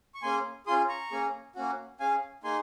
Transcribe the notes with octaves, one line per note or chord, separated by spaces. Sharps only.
C#6
A#3 C#4 G#4 G#5 C6
C#4 F4 G#4 C6 D#6
A#5 C#6
A#3 C#4 G#4
A#3 C#4 F#4
C#4 G#4 F5 G#5
A#3 D#4 G#4 G#5 C6